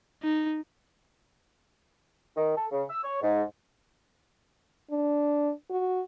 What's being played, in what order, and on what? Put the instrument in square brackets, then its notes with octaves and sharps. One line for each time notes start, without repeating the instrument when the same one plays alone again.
[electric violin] D#4
[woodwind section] D#3
A4
C#3
E6
C#5
G#2
[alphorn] D4
F#4